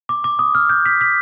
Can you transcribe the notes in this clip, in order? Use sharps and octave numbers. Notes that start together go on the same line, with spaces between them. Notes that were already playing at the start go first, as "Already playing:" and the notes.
D6
D6
D#6
F6
G6
B6
B6